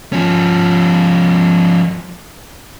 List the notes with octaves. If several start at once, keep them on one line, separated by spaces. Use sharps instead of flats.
F3 C#4